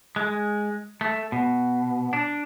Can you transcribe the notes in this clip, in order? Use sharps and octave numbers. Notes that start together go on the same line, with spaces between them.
G#3
A3
B2
D4